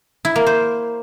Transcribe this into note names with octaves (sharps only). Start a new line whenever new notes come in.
E4
A#3
C5